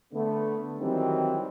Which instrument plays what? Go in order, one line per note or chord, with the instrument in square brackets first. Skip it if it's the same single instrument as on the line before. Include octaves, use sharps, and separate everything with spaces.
[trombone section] D3 A3 B3
D#3 E3 F#3 G3 C4 E4